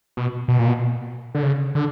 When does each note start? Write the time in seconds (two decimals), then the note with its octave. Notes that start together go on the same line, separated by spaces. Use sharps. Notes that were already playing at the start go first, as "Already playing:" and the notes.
0.17 B2
0.48 B2
0.59 A#2
0.68 B2
1.35 D3
1.43 C#3
1.75 D3